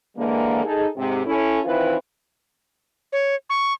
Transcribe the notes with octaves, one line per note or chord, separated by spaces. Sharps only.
D3 E3 G#3 A#3
D#4 G#4 A4
G#2 C3
C#4 E4 A4
D#3 E3 C4 E4 F4 B4
C#5
C#6